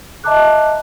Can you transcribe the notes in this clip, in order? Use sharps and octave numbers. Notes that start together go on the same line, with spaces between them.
D#5 E5 A5 A#5 D6 F#6